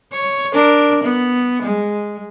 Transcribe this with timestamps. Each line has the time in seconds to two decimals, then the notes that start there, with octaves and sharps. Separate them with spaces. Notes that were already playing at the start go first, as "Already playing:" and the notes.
0.13 C#5
0.53 D4 A#4
1.04 B3
1.62 G#3